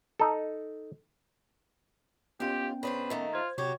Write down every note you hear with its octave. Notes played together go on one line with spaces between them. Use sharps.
D#4 A4
D#2 B3 C#4 F4 G4 G5
C#3 D4 B4 C5
D#3 A3 A#3
F4 C5 G#6
C3 F#3 F#4 G4 C#5